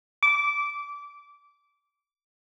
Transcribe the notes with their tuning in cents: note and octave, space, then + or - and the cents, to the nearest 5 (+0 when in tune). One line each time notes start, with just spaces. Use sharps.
D6 -20